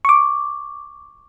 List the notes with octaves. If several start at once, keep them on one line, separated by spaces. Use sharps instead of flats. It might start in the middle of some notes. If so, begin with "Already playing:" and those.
C#6 D6